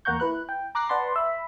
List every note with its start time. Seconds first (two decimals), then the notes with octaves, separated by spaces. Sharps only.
0.05 E2 A#3 F#5 A#5 C#6 G6
0.20 E4 B4 F#6
0.49 G5
0.75 A#5 D6 F#6 A#6 C7
0.89 B4 D5 F#5 A5 B5 C6
1.16 E5 B5